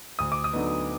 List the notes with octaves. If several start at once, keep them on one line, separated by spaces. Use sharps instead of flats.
D2 D#6
D6
D#6
D3 F#3 B3 D#4